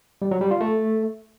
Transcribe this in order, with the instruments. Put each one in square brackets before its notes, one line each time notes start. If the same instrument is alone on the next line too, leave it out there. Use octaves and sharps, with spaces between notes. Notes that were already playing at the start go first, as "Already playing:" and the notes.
[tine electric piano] G3
F#3
G3
F4
A3